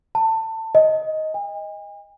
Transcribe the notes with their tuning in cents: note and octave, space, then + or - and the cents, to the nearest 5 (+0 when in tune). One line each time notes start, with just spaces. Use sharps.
A5 +25
D#5 +10
G#5 -45